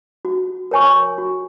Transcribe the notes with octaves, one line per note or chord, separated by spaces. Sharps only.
F#4
A#4 C#5 G#5 C#6
F#4